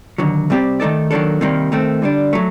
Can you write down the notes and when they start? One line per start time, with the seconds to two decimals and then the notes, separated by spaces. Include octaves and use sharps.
0.18 D#2 D3 F#3
0.50 C3 G3 C4 G4 D5
0.80 D#3 A3 D#4 A4 D5
1.11 D#3 F#3 A#3 D4 A4
1.41 C3 D#3 G3 A#3
1.72 D#3 A3 C4
2.02 D3 G3 D4
2.33 F#3 A3